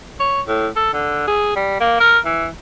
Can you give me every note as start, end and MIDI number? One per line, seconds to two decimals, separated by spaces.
0.20 0.41 73
0.48 0.68 45
0.76 0.92 69
0.93 1.27 50
1.27 1.55 68
1.56 1.79 55
1.80 1.97 58
2.00 2.19 70
2.25 2.47 52